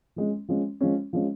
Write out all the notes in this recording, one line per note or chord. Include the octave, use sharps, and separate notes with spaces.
F3 G#3 C#4
F3 G#3 C#4
F3 G#3 C#4
F3 G#3 C#4